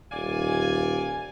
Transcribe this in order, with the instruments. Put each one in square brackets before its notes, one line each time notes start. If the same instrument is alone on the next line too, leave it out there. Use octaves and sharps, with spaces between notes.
[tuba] D#1 [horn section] D5 F5 G#5